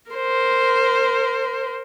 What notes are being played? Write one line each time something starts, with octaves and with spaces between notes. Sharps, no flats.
A#4 C5